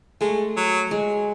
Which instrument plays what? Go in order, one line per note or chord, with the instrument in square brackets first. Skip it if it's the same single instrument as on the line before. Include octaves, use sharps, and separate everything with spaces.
[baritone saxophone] G#3 [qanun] A3
[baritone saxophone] F#3
[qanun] G#3